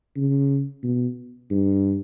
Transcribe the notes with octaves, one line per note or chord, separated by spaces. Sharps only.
C#3
B2
G2